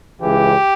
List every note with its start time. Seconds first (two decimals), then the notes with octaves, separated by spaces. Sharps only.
0.21 C#2 C#3 E3 G4